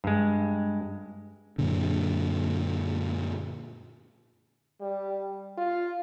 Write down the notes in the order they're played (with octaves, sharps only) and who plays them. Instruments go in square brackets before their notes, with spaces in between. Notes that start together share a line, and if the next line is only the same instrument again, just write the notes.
[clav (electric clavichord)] G2 G#3
[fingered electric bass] F#2 A#2 D3
[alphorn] G3
F4